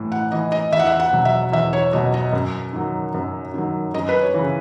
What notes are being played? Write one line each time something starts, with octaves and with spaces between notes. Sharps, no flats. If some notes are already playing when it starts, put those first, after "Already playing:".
Already playing: A2 E3
F#5
E3 D#5
D#5
E2 E5
F#5
E5
F#5
B2 F#3
E5
E2 E5
C#5
B2 F#3 D#5
D#5
F#2
D#3 F#3
F#2
D#3 F#3
F#2 D#5
B4
C#5
C#3 E3